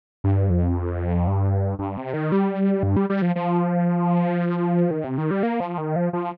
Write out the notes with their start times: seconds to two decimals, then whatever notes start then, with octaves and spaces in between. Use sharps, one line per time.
0.24 G2
0.50 F2
1.27 G2
1.79 G2
1.97 C3
2.13 D#3
2.32 G3
2.83 G2
2.96 G3
3.10 G3
3.22 F3
3.36 F3
4.91 D#3
5.04 C3
5.18 D#3
5.31 G3
5.43 A#3
5.60 F3
5.78 D#3
5.96 F3
6.13 F3